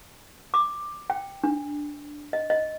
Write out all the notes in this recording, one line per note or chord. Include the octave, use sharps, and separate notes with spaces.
D6
G5
D4
D#5
D#5